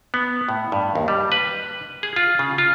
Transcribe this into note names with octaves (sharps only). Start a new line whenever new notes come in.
B3
A2
G2
D#2
G3
B4
G#4
F4
C#3
F4